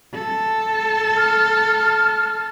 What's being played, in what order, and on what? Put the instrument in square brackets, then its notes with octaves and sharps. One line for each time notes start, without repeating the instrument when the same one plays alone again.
[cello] A4
[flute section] F6